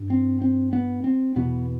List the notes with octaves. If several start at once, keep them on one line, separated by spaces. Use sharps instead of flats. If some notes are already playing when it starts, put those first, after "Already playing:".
Already playing: G2
C4
C4
B3
C4
E2 B2 B3